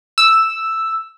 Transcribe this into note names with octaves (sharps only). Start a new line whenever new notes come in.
E6